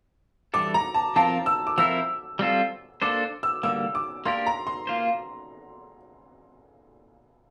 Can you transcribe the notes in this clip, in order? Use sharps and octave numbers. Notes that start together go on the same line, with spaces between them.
E3 G3 D4 A4 D6
A#5
A5
F3 C4 F4 A#4 A5
E6
D6
F3 C4 E4 A#4 E6
G3 C4 F4 A4
A#3 D4 A4 C5 D6
E6
D3 G3 A#3 E6
D6
A#3 D4 G4 A#4 C6
A#5
C6
A#3 F4 C5